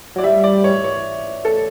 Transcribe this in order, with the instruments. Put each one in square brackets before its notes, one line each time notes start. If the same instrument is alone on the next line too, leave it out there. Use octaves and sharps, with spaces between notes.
[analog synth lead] F#3 [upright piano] D5
[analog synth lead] G3 [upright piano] E5
[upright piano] D5
C#5
C#5
A4